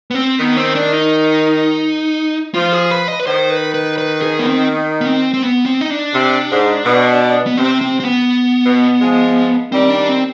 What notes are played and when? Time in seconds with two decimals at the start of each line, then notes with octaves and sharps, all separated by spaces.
0.11 B3
0.15 C4
0.39 D#3 B3
0.57 C4
0.75 D4
0.92 D#4
2.54 F3 F4
2.73 G#4
2.91 B4
3.08 D#5
3.19 B4
3.26 D#3 C5
3.50 B4
3.74 B4
3.98 B4
4.22 G#4
4.39 B3
4.45 C4
5.01 B3
5.06 C4
5.34 C4
5.42 B3
5.66 C4
5.81 D#4
5.90 D4
6.13 C3
6.50 G#2
6.85 B2
7.47 B3
7.57 C3 C4
7.81 C4
8.00 C4
8.05 B3
8.65 B2
9.00 F3 G#3
9.72 D#3 G3 C4
9.90 D4
10.09 C4